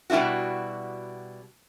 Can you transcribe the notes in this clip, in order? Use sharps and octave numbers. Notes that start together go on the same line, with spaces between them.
B2 G3 D4 E4 F#4